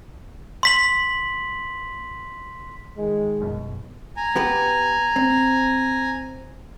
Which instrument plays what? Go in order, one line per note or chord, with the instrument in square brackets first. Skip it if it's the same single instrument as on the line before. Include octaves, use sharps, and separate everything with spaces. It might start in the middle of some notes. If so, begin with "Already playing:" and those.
[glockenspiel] C6 B6 F#7
[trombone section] D#3 G#3
[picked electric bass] G1 F#2 B2
[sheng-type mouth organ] G#5 A#5
[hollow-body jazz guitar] B3 G4 B4
C4